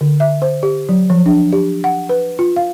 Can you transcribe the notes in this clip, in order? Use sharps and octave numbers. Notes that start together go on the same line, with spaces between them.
D3
E5
C5
G4
F#3
F3
D4
G4
F#5
B4
F4
F5